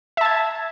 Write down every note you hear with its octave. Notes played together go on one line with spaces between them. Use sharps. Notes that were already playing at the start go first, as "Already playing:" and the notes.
E5 A5 G#6